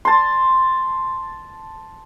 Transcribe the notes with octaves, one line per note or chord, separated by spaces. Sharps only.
A5 C6